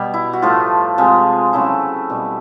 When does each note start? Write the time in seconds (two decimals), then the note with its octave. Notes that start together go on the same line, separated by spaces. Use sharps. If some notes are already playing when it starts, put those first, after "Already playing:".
Already playing: B2 G3
0.14 E4
0.33 F#4
0.42 A2 F3 A3 F4
0.98 C3 F3 G#3
1.53 C#3 F#3 A3 E4
2.10 B2 G3